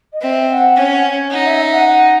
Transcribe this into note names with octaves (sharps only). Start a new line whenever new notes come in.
D#5
C4 E5
F#5
C#4 G#5
F#5
G#5
D#4 F#5
E5
E5
F#5
F#5